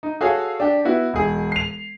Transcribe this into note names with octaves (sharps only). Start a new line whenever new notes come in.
D#4
F#4 G#4 A4 C#5 F5
D4 G4
B3 E4 F#4
E1 G#4
C7 F7